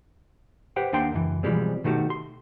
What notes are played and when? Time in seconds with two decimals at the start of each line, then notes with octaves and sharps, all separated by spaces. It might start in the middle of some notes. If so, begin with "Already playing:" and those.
0.76 G4 B4 C5 F#5 G5
0.92 D#2 A#3 D4 F#5 G5 C6
1.13 C#2 F#2 E3
1.43 B2 E3 F3 G3 G#3 C4
1.84 B2 D#3 A3 F#4 G4
2.10 C6